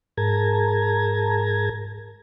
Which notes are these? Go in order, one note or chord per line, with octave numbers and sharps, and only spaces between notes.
G#2 G#4 A#4 A5 A#5 G#6